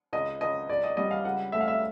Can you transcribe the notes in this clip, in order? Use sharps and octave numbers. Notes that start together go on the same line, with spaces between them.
C#2 D#5
C#2 D#5
C#2 D5
D#5
G3 D#5
F5
C#2 F#5
A3 E5
F5
E5